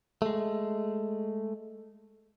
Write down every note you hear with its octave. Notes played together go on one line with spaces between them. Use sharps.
G#3 A3